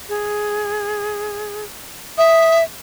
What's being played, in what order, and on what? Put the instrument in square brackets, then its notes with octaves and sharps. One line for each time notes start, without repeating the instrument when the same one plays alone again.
[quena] G#4
[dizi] E5 [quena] D#6